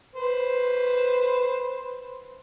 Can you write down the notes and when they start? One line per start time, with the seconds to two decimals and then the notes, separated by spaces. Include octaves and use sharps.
0.15 B4 C5